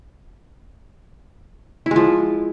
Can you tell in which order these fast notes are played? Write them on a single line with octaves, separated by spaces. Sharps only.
E4 G#3 F3